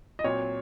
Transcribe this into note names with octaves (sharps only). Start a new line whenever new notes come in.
D#5
A#2 F#3 C4 C#5